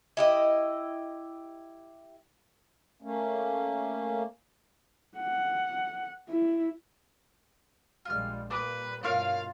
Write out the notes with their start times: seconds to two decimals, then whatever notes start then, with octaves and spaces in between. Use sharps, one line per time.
0.17 E4 G4 D#5
3.02 A3 A#3 C#4
5.18 F#5
6.29 E4
8.05 A#1 G3 G#3 F4 F6
8.51 A#2 G3 A#3 B4 D6 D#6
9.04 G2 B2 F4 A#4 C#5 F5